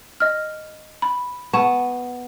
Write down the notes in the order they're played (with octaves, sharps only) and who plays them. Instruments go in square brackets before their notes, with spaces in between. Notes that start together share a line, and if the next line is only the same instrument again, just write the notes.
[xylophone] D#5 F6
B5
[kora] B3 [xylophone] A5 C#6 E7